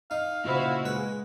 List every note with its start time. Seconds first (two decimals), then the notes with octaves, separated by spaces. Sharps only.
0.11 D#4 F5
0.44 A#2 C#3 E4 F#4 C5
0.85 G#3 B4